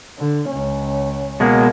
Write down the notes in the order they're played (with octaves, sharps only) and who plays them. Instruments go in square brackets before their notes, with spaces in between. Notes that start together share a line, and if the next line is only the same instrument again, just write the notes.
[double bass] D3
C#2 C#4
[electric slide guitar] B2 G#3 A#3